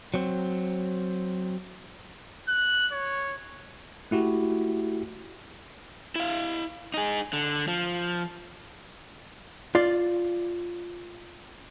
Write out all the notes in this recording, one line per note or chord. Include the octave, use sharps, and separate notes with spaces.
F#3 C4
F#6
C#5
A3 E4 F#4 G4
E4 F5
D#4 G#4
D3
F3
F4 D5